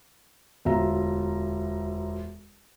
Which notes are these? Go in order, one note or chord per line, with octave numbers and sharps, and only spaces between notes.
E1 D2 F4 E5 A#5